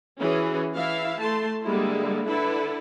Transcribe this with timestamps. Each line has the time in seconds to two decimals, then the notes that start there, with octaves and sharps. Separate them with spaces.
0.20 E3 C#4 F#4 G#4
0.77 E3 E4 E5 F5
1.20 A3 A5 C6
1.65 D3 G3 G#3 A#3 E4
2.28 D3 D4 E4 A4 B4